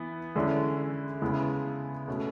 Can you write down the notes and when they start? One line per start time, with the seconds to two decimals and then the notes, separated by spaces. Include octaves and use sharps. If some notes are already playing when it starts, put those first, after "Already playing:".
Already playing: E3 B3
0.35 D3 G#3 C#4 E4
1.22 C#3 G#3 B3 E4
2.08 B2 A3 C#4